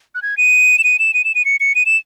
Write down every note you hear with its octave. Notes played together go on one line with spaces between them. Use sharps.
F#6
G#6
D#7
E7
D#7
E7
D#7
E7
D#7
C#7
C#7
D#7
E7